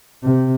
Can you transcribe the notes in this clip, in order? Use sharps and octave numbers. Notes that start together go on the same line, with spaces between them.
C3